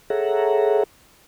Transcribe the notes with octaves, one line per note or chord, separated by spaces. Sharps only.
G#4 A4 C#5 E5 F#5 A#5